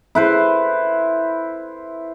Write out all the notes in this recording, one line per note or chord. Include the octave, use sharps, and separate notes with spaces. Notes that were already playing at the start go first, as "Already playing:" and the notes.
E4 B4 C5